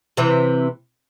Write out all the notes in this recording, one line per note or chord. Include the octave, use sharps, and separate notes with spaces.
C3 E3